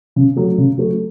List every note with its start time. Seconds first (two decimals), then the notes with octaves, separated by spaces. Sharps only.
0.16 C#3
0.36 F#3 A3
0.58 C#3
0.77 F#3 A3